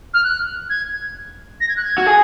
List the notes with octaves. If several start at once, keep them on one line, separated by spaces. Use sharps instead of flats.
F6
F#6
G#6
A#6
G#6
F#6
G#6
F#4
G#4